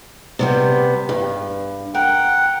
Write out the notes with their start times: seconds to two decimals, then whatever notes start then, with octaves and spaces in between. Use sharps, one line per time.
0.39 C3 G3 B3
1.09 G2
1.95 A#4 F#5 G5